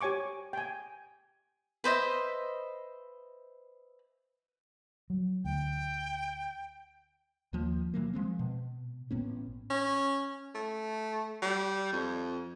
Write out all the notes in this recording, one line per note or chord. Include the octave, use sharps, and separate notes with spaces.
G4 C#5 G#5 C#6 D6
G5 G#5
B4 C5 D#5 E5
F#3
D2 G5
D#2 F3 A#3
C3 E3 F#3 A#3
F3 G#3 C4
B2
A1 A2 B3 C#4
C#4
A3
G3
F2